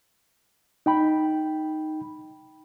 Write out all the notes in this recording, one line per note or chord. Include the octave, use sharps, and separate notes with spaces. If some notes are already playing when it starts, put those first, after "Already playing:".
D#4 G5 B5